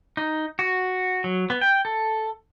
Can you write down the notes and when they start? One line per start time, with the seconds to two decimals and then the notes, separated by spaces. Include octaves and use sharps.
0.17 D#4
0.59 F#4
1.24 F#3
1.50 B3
1.61 G5
1.85 A4